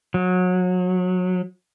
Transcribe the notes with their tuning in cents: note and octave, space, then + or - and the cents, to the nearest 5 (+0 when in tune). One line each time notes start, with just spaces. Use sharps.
F#3 -25